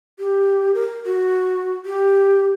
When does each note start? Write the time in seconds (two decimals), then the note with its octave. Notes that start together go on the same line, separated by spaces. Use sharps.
0.19 G4
0.75 A#4
1.06 F#4
1.85 G4